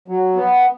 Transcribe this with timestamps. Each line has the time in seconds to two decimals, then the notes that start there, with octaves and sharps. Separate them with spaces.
0.08 F#3
0.36 B3